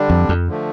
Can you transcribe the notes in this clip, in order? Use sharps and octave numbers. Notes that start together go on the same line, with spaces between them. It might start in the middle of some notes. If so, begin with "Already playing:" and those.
Already playing: D3 G3 D4
F2
F2
D3 F3 A3